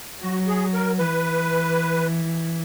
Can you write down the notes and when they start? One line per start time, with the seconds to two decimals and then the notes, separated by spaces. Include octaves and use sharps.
0.21 F#3 F#4
0.47 G#4
0.74 A#4
0.99 E3 B4